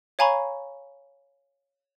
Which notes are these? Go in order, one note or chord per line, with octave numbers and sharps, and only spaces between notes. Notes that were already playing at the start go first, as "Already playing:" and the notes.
C#5 F5 G#5 A#5 B5 C#6